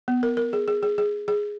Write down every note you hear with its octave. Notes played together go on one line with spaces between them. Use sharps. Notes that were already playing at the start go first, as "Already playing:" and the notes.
B3
A#4
A#4
G#4
G#4
G#4
G#4
G#4